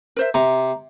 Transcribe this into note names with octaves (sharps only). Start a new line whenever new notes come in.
A#4 C5 E5
C3 A#5